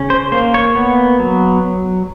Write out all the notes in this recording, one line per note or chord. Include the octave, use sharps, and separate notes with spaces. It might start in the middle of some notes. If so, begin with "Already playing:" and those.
Already playing: C#3 C#4
C5
A#3 C5
C#5
B3
F#3